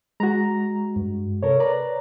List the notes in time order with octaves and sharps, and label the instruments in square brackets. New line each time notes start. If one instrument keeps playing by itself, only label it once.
[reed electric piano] G#3 F#4 [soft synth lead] A#5
[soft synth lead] G2
[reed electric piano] C3 A4 A#4 [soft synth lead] C#5
[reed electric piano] B4 D5 A#5